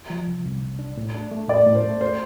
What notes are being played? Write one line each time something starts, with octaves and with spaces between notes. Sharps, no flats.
F3
C2
C2
C2
D4
A2
D4
A3
A2 D5
A2
C5
A3
C5